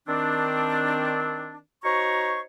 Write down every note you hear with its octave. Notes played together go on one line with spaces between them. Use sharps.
D#3 C4 D4
D#4 F#4 C5 C#5 A#5 C#6